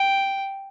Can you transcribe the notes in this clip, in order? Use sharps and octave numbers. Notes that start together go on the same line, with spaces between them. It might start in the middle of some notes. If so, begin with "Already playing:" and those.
Already playing: G5